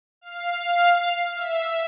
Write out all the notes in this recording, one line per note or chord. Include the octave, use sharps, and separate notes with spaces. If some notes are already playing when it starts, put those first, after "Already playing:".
F5
E5